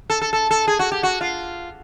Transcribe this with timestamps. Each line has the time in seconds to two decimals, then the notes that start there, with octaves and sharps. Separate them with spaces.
0.10 A4
0.21 A4
0.33 A4
0.51 A4
0.68 G#4
0.79 F#4
0.92 G4
1.03 F#4
1.21 F4